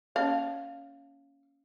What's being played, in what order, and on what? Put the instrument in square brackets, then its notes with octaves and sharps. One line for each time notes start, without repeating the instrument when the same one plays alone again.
[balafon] A#3 C#4 C#5 [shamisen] F5